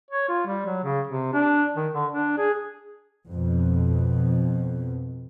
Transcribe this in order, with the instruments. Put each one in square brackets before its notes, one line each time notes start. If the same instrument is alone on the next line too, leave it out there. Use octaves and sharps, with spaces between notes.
[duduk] C#5
F4
G3
F#3
C#3
C3
D4
D#3
D3
D4
G#4
[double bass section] F2 B2